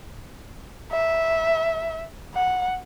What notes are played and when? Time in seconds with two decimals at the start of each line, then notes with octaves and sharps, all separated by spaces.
0.92 E5
2.34 F#5